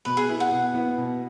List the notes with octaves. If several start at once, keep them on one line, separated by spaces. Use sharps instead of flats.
B2 B4
G#4
B3 E4 B4
F#5
B2
B3 E4 B4
B2